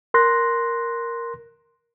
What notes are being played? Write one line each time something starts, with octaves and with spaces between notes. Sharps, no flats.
A#4 C6 F#6 A#6